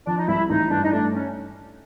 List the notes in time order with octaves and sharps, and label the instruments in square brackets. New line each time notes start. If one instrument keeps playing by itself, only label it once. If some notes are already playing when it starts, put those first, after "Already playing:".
[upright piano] F3 [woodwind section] D4
[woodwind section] D#4
[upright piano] C2 [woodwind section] E4
[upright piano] A1 [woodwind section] D#4
[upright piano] G2 [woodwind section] D4
[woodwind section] D#4
[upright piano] A3 [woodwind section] D4
[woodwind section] C#4